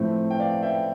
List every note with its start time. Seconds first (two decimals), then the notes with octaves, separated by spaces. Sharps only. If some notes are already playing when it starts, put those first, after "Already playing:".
Already playing: A2 F3 A3 C4
0.31 G5
0.40 D5 F5
0.63 E5 G5